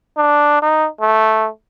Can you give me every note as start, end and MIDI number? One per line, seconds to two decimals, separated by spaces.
0.17 0.60 62
0.62 0.87 63
1.01 1.48 57